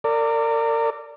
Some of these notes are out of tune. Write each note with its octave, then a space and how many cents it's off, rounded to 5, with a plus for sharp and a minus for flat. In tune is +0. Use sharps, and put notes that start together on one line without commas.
A#4 -30 D5 +0